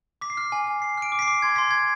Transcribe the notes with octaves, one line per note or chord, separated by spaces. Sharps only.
D6 B6
C7
F6 B6
G#5
G#5
G#5 C7
F6 D7
D6
B6
C7
D6
C6 G#6
C6 B6
C6 G#6